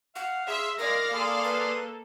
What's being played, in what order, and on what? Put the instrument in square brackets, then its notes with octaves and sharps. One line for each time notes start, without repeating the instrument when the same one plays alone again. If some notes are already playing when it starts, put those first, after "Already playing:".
[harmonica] F5 [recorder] F#5
[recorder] G#4 [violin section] E5 C6
[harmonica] G#3 [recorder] A#4 [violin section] D5 F5 [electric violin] A#6
[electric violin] A#3 A4 [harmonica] G#4 C6 D#6
[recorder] B4